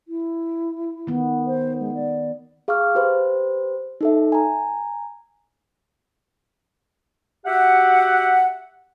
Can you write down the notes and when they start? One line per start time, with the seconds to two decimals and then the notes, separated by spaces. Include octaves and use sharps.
0.08 E4
1.07 D#3 B3
1.47 C5
1.80 G#3
1.95 D5
2.68 G#4 F5 C#6 D6 F6
2.95 G4 B4 C5
4.01 D#4 A4 E5
4.32 G#5 A#5
7.46 F#4 G4 E5 F#5